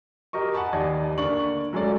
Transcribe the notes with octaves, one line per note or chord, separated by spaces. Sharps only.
G4 A#4 D#5 C#6
F#5 G#5 A5 B5
D#2 D5 D#5 G#6
D3 A#3 D4 D5 C#6 F#7
F#3 G#3 C#4 A4 D5